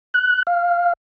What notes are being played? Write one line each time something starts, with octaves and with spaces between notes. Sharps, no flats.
F#6
F5